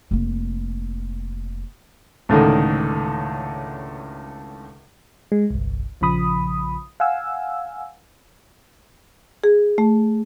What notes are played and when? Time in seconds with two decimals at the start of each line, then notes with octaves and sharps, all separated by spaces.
0.11 F1 A#3
2.29 C#2 A2 D3 D#3
5.32 G#3
5.50 G1 C2
6.01 A#1 C#3 F3 B5 D#6
7.00 F5 F#5 G#5 E6
9.44 G#4
9.78 A3